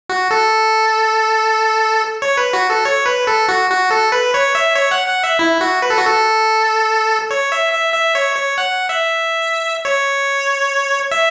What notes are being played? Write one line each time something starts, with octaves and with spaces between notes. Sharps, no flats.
F#4
A4
C#5
B4
F#4
A4
C#5
B4
A4
F#4
F#4
A4
B4
C#5
E5
C#5
F#5
F#5
E5
E4
F#4
B4
A4
F#4
A4
C#5
E5
E5
E5
C#5
C#5
F#5
E5
C#5
E5